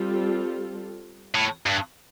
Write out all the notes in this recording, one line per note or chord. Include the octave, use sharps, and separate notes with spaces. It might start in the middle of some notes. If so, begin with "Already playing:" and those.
Already playing: G3 C4 F4 A4
A2
G2